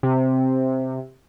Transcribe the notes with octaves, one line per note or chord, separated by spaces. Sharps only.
C3